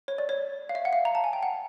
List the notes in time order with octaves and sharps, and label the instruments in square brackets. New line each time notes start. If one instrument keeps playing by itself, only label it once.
[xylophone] C#5
D5
C#5
F5
E5
F#5
F5
A#5
A5
G#5
G5
F#5